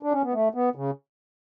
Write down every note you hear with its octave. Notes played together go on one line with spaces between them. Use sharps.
D4
C#4
B3
A3
B3
C#3